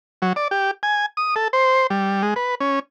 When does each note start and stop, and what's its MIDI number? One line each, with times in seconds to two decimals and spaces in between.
0.22 0.33 54
0.36 0.48 74
0.51 0.71 67
0.83 1.06 80
1.17 1.35 87
1.36 1.48 69
1.53 1.87 72
1.90 2.22 55
2.22 2.34 56
2.36 2.55 71
2.60 2.79 61